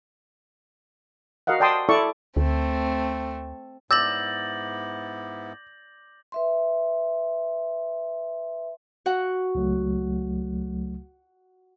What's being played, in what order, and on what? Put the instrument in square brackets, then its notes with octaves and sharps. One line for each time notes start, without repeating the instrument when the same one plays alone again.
[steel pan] F#4 A#4 D#5 F5 F#5
D5 G5 A5 C6 D#6
E4 A4 D5 A5 C#6
[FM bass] D2 [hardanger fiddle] A3 C4
[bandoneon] G#2 B3 E4 [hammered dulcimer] D5 [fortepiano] E6 [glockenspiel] G6 A#6 F#7
[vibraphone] B4 E5 C6
[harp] F#4 F#5
[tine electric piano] C#2 F#3 A3